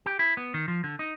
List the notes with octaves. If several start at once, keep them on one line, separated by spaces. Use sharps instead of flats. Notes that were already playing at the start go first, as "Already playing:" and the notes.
G4
E4
B3
D#3
F3
D3
D#4